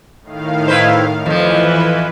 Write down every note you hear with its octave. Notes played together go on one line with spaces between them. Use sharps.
A2 D#3 F5
E4 B4 C5
F2 E3 F3 B4